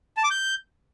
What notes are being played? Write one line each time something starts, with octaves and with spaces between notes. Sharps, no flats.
A5
D6
G6